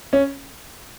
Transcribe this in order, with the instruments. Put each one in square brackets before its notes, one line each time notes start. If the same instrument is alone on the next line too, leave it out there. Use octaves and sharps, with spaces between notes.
[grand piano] C#4